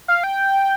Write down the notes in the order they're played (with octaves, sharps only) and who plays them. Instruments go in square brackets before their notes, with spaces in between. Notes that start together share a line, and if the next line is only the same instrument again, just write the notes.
[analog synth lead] F5
G5